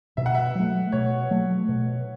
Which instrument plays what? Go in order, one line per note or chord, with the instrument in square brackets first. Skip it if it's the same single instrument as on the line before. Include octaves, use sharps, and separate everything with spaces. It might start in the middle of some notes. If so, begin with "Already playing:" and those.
[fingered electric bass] B2 [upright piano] E5
[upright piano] F#5
E5
[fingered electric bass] F#3 A3
[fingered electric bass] B2 [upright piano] C#5
[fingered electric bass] F#3 A3
B2